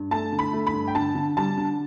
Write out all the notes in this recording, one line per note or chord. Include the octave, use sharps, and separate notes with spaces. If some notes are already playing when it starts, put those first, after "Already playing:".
Already playing: G2
A3 A5
D3
B5
A3
B5
G2
G5
D3 A5
D3
G3 A5
D3